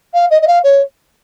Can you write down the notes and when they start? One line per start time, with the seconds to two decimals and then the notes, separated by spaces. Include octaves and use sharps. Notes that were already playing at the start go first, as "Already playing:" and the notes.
0.13 F5
0.30 D#5
0.42 D#5
0.47 F5
0.64 C#5